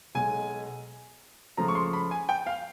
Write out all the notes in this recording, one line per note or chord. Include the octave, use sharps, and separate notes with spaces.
B1 B2 G#3 G#5
C#2 C#3 F3 A3 A#5
C#6
C6
B5
G#5
G5
F5